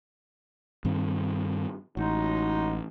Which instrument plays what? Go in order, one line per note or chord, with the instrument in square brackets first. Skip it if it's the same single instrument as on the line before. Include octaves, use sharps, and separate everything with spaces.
[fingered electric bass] G2 D#3 C4
[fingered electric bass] A1 [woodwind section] F#3 G#3 D#4